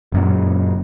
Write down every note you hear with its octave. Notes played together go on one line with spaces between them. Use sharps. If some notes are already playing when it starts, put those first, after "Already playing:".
F#1 F#2 A#2